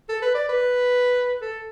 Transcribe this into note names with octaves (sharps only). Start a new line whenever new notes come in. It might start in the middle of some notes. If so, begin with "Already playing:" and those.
A4
B4
D5
B4
A4